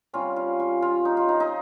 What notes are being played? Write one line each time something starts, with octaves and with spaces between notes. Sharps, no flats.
C3 G3 C#4 F4
F4
F4
F4
D#4
F4
D#4
D#4